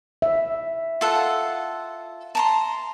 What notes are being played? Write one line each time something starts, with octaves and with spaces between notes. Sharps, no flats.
E5
F4 A4 F#5
A5 A#5 C6